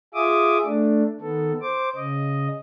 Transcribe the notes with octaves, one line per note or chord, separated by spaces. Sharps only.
F4 G#4 E5 D6 D#6
A3 D4
D#3 B3 A4
C5 D6
C#3 D#5